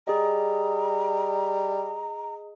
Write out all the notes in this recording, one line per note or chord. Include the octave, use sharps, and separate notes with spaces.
G3 G#4 D#5 A#5